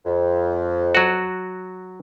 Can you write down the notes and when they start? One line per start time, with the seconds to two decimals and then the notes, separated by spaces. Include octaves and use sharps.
0.06 F2
0.95 F#3 F#4